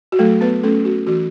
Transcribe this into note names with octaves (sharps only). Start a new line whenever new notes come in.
F#4
F#3 A3 A4
B3 B4
A3 C#4 A4
F#4
E3 F#4